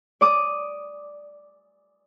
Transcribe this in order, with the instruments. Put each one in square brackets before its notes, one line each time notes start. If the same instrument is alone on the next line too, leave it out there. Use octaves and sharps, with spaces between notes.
[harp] D5 D6 D#6